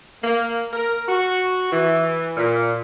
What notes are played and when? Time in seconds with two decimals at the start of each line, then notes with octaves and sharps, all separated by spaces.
0.23 A#3
0.73 A#4
1.09 F#4
1.72 E3
2.37 A#2